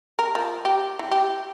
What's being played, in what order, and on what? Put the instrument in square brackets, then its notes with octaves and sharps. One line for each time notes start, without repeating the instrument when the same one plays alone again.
[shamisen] A#4
F3
G4
E3
G4